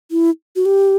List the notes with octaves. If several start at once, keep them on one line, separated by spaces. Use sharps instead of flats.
E4
F#4
G4